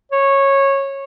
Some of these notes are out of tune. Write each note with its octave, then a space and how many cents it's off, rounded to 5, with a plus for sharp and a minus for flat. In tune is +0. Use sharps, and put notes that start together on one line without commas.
C#5 -15